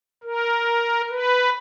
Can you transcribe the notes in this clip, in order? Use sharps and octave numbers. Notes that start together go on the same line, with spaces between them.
A#4
B4